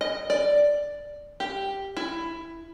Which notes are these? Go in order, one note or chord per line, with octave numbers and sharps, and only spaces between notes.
D#5
D5
G4
E4